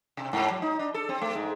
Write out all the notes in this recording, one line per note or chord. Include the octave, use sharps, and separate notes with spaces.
C3
G#2
F#3
D#4
D4
A4
C4
A3
G#2